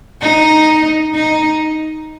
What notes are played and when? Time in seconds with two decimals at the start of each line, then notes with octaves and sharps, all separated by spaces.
0.21 D#4
1.15 D#4